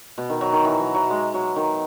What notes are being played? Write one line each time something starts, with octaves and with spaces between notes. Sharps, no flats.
B2
D#3
F#3
D#3
E3
F#3
F#3
G#3
F#3
D#3